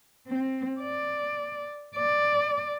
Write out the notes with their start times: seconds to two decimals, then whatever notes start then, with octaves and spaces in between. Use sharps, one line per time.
0.27 C4
0.81 D5
1.96 D5